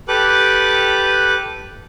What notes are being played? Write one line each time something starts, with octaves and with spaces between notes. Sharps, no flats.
G4 A4 B4 D6 F#6